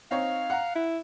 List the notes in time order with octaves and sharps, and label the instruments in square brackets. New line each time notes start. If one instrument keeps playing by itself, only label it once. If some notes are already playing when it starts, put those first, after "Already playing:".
[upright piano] C4 D#4 C#5 [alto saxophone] F5
[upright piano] F#5 A#5
[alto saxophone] E4